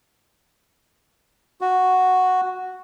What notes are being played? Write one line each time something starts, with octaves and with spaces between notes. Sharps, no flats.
F#4